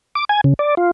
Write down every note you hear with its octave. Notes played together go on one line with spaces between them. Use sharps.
D6
G#5
C#3
D5
F4